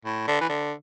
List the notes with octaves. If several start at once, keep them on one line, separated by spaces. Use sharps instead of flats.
A2
D3
E3
D3